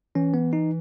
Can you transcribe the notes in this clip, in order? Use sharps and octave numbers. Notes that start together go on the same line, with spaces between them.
E3 C#4
B3
D#4